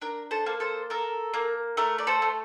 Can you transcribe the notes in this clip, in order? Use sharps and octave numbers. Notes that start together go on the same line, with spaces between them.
D4 A#4
A4 C5
A#3
A4 C5
A4 A#4
A#3
A3 A#4
D5
A4 C5
A3